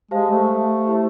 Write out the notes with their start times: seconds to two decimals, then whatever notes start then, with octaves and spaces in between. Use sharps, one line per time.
0.11 G#3 G4 C5 F5 A5
0.30 A3
0.87 E4 G4 C5